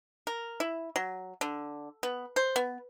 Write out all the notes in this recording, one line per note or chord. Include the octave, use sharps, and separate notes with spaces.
A#4
E4
F#3
D3
B3
C5
B3